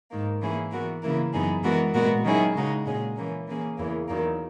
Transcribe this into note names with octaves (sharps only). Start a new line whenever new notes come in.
G#2 D#3 A#3
E3 A#3 C#4 E4 G#4
E3 B3 F#4 A#4
C#3 E3 A#3 E4 A#4
F#2 E3 B3 D#4 G#4
E3 G#3 B3 F#4 A#4
A#2 G#3 B3 F#4 A#4
D#3 F#3 C#4 E4 G#4
C#3 G#3 D#4 F#4
A#2 G#3 C#4 G#4
E3 A#3 C#4
E3 A#3 C#4 G#4
E2 C#3 E3 A#3
E2 D#3 F#3 A#3